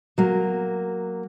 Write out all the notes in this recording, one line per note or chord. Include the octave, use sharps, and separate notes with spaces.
F#3 A#3